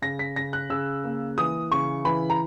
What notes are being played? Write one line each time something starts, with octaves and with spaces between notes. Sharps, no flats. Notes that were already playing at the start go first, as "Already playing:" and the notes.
C#3 A#6
B6
C#3 A#6
F#6
C#3 E6
A#3
E3 D#6
C#3 C#6
E3 B5
A#5